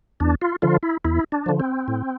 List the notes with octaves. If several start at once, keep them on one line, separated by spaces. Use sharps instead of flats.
E2 D4
F4
D3 F3 F4
E4
E2 E4
D4
D3 F3
C4
A2